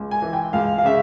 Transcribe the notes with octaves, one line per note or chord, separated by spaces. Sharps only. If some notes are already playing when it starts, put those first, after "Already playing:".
Already playing: C#2
G#5
E3
G5
C#2 F5
F5
C#3 E5